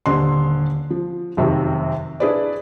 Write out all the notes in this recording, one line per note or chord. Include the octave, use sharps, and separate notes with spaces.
D#1 D3 C6
F3
F1 F#2 C3 D#3
D4 E4 G#4 B4 D5